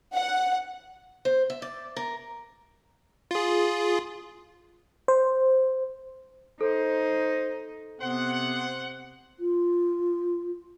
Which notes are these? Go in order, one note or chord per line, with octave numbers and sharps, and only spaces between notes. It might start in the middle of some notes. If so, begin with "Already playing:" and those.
F#5
C5
E5
D5
A#4
F4 G#4
C5
D#4 A4 C5
C3 B3 C5 F#5
F4